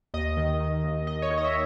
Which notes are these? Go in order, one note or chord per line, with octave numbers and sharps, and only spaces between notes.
D#2 D#5
D#3
D#3
D#2
D#2 D#5
C#5
D#3
D#5
E5